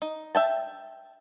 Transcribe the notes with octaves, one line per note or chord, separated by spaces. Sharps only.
D#4
E5 G5 A5